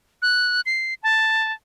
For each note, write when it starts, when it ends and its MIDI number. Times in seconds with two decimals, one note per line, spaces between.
0.22 0.61 90
0.66 0.94 96
1.03 1.52 81